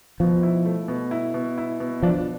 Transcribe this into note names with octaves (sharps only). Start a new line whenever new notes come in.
B2 F3
E4
A3
B2
E4
B2
E4
B2
F3 D4